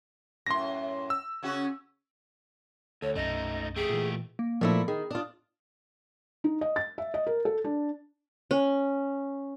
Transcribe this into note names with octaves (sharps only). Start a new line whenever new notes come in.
F#2 A2 C6 A#6
E6
C#3 C#4 F#4
D2 A4 C#5
B1 F#2 A3 D#4 D#5
A3 G4 G#4
A#2 E3
A#3
A#2 F3 A3 E4
D#3 G#4
D4 F4 D#6
D#4
D#5
A6
E5
D#5
A#4
A4
D4
C#4